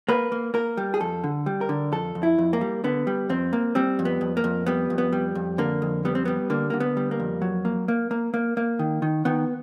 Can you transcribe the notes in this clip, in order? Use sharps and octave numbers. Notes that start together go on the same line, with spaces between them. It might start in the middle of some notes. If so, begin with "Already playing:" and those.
A#3 B4
A#3
A#3 A#4
G3
G#4
F2 A4
D3
G3
A#4
D3
F2 A4
F2
E4
F2
A#3
G3
D3 B3
G3
F2 C4
A#3
G3 C4
F2
B3
F2
A#3
F2
G3 B3
F2
B3
G3
F2
D3 A#3
F2
G3 B3
C4
G3 B3
D3 A#3
D3 A#3
B3
G3
A#3
F2
F#3
A#3
A#3
A#3
A#3
A#3
D#3
D#3
D#3 B3